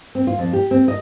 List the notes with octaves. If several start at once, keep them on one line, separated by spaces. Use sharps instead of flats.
C4
F4
F2
G4
C4
D#5